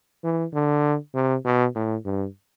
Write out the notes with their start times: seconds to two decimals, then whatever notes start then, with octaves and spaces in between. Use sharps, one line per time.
0.24 E3
0.54 D3
1.14 C3
1.45 B2
1.75 A2
2.05 G2